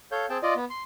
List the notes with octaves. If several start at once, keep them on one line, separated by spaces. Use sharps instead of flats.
A4 C#5 F5 G6
C4 G#4 G5 A5
F4 D5 D#5
B3
C6